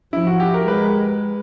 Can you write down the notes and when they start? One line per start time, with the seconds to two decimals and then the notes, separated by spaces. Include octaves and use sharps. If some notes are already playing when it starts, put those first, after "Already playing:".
0.13 F3 E4
0.27 F#4
0.40 G4
0.54 A#4
0.67 G#3 B4